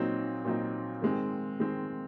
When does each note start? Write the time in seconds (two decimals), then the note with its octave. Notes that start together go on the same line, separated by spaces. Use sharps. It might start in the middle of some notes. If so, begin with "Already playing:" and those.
Already playing: A#2 F#3 C4 D#4
0.45 A#2 F#3 C4 D#4
1.02 D#3 G#3 C4
1.60 D#3 G#3 C4